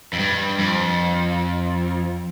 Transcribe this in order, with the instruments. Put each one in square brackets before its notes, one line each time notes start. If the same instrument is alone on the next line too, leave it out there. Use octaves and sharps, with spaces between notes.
[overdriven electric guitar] F2
G2
F2